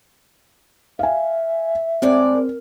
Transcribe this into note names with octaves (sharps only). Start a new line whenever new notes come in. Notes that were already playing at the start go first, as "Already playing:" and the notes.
E5 F5 G#5
A2 G#3 C4 D5
A#4